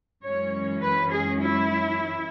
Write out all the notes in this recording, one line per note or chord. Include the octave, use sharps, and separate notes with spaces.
F#2 E3 G#3 C#4 C#5
B4
G#4
E4